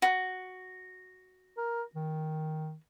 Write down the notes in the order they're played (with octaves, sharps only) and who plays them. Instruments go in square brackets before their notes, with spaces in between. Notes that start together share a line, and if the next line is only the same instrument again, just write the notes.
[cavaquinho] F#4
[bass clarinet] A#4
D#3